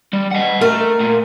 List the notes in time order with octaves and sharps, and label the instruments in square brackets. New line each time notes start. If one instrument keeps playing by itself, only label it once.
[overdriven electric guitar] G3
D#5 F#5
[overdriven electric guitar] A3 [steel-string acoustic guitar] A#4
[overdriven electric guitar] A#2